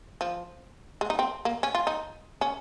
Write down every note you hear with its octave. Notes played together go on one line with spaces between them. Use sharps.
F3
G#3
D#4
C4
A#3
C#4
F4
D#4
C#4